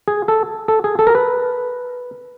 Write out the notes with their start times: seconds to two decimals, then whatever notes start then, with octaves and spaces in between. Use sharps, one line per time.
0.08 G#4
0.28 A4
0.68 A4
0.84 G#4
0.99 A4
1.07 A#4
1.15 B4